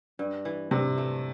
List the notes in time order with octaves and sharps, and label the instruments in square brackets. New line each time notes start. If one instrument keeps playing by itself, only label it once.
[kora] G2
E3
[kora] G2 [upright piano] C3
[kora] A3